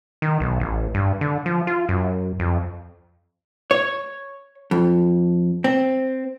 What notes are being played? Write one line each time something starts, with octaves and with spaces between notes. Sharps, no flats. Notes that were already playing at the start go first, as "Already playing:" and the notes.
D#3
B1
A1
G2
D3
F3
F4
F#2
F2
C#5
F2
C4